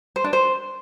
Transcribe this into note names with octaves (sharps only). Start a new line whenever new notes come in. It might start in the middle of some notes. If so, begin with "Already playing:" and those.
C5
D4
C5